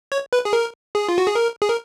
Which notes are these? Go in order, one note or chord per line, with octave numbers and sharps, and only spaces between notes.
C#5
B4
G#4
A#4
G#4
F4
F#4
G#4
A#4
G#4
A#4